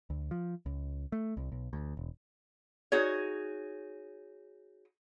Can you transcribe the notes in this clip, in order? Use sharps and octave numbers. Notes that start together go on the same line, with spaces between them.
D2
F3
C#2
A3
C2
B1
D2
E1
D#4 F#4 G#4 C#5